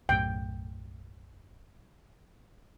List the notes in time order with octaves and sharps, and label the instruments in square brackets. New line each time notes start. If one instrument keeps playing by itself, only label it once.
[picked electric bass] B1 F#2 A2 [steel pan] G5